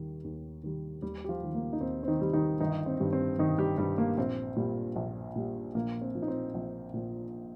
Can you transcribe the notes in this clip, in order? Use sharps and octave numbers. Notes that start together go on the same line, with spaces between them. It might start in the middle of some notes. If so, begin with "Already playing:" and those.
Already playing: D#2 D#3 G3
D#2
D#3 G3
D#2 G3 G4
G4
F3 F4
D#3 G3
A#3
D#4
D#2 C4
C4
D#3 D#4
D#3 G3
D#3 D#4
G1 D#3 D#4
C4
G2 D#3 G3
C4
G1 D#3 D#4
G3 G4
G2 D#3 G3 G4
A#3
A#1 C4
A#2 G3
A#1
A#2 G3
A#1 A#3
C4
A#2 F3
D#4
C4
A#1
A#2 F3